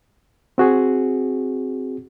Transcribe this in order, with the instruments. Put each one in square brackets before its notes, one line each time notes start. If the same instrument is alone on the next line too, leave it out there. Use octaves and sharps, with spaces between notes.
[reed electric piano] C4 F#4 G#4